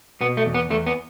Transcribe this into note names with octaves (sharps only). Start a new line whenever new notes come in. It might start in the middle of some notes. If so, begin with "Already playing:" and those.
B2 B3
A3
E2
B3
E2 A3
B3